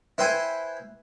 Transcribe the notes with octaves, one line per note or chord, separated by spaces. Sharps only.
E4 B4 C5 G5 G#5